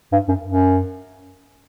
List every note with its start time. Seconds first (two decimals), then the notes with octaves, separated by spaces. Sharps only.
0.12 G2
0.28 F#2
0.45 F#2